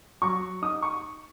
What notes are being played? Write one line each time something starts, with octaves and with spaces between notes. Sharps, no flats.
F#3 C#6
D#4 D#6
C#6